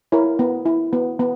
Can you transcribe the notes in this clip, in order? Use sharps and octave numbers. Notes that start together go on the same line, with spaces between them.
E4 A#4 C#5
B3
E4
B3
B3